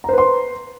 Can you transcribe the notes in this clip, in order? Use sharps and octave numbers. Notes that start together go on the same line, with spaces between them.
B4 C5 A#5 C6